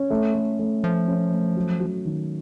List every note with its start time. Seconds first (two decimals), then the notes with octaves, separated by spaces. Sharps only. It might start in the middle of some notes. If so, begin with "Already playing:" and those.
Already playing: C#4
0.10 A3
0.34 A3
0.59 A3
0.83 F3 A3
1.08 C#4
1.31 A3
1.56 F#3
1.80 F#3
2.05 D#3